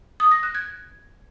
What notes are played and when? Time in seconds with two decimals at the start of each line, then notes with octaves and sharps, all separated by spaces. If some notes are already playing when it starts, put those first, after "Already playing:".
0.20 D#6
0.31 A#6
0.43 F#6
0.55 G#6